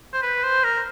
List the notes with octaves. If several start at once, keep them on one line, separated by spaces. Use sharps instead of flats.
C5
B4
C5
A#4